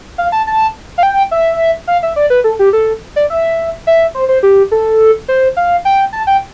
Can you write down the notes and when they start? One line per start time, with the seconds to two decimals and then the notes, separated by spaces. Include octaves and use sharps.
0.18 F5
0.32 A5
0.47 A5
0.98 F5
1.03 G5
1.31 E5
1.87 F5
2.03 E5
2.16 D5
2.30 B4
2.44 A4
2.59 G4
2.73 A4
3.16 D5
3.30 E5
3.87 E5
4.15 C5
4.29 C5
4.43 G4
4.71 A4
5.28 C5
5.57 F5
5.85 G5
6.13 A5
6.27 G5